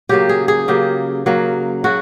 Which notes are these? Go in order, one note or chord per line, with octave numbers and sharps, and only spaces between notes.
C#3 F#3 A#3 G4
G#4
G#4
C#3 F#3 A#3 G4
C#3 F#3 A#3
C#3 F#3 F#4